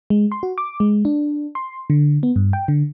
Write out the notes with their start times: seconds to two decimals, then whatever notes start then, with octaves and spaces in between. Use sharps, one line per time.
0.10 G#3
0.32 C6
0.43 F#4
0.58 D6
0.80 G#3
1.05 D4
1.55 C6
1.90 D3
2.23 B3
2.36 G2
2.53 G5
2.68 D3